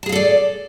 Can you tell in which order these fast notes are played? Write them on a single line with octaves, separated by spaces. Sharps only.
A5 G#4 F5 A4 D5